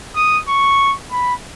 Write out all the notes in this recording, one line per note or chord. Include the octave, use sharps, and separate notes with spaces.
D#6
C#6
B5